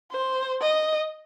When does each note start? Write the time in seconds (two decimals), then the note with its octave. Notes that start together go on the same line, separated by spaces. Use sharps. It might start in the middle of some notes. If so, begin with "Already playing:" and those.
0.12 C5
0.61 D#5